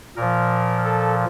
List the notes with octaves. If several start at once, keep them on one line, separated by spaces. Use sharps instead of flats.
A#2 F3 A#4
A4